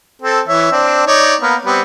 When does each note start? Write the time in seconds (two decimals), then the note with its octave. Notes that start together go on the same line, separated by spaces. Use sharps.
0.22 C4 A4
0.48 E3 C#5 E5
0.72 C4 D4
1.07 D#4 C#5 D5
1.41 A#3 B3 A#4
1.65 G3 B3 C4